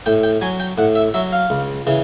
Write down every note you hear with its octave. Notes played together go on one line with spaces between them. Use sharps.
A2 G5
G5
F#3 G#5
G5
A2 F#5
E5
F#3 E5
F5
C#2
C#3 E3